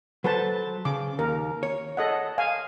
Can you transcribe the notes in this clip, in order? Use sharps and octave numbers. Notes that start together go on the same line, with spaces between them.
F#3 A4 B4 C5 A5
C#3 D6
D#2 A#4
C#5
A4 D#5 F#5
F5 G#5